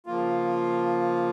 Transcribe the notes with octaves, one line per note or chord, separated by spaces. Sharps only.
C#3 F3 A#3 F4